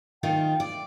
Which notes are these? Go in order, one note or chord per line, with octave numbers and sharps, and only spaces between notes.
D#3 D#4 F4 G5
D5